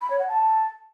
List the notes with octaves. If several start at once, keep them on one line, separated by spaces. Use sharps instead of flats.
B5
C#5
F#5
A5